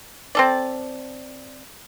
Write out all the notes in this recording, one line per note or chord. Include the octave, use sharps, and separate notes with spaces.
C4 A4 D5